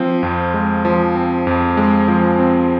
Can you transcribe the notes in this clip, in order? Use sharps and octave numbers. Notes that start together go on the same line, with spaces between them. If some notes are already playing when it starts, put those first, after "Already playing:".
Already playing: F3 C4
F2
G#3
F3
C4
F2
G#3
F3
C4